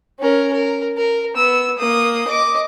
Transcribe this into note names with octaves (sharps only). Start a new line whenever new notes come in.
C#4 A#4
A#4
A#4
B3 E6
A#3 D#6
D#5 D6